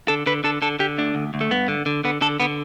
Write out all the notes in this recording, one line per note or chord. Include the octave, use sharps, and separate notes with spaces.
D3 A4
D3 B4
D3 A4
D3 A4
D3 G4
D2 D4
D2
D2
A3
G2 B3
D3
D3
D3 B3
D3 A4
D3 B3